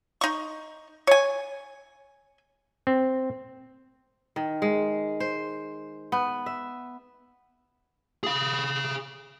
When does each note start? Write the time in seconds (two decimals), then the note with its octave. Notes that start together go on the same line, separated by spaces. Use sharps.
0.21 D#4 C#6
1.07 C#5 G#5
2.87 C4
4.36 D#3
4.62 G#3
5.20 C5
6.12 B3
6.46 E5
8.24 G#4 F5